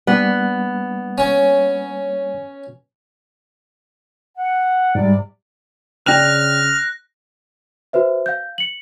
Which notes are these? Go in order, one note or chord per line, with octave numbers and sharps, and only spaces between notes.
G3 A#3 B3 D4
C#4
F#5
G#2 C3 G3 D5
C#3 D4 G5 F6 F#6 A#6 F7
F#4 B4 C5 E5
F5 G6
C#7 F#7